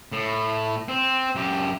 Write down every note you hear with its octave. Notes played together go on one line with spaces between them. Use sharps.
A2
C4
F#2 G4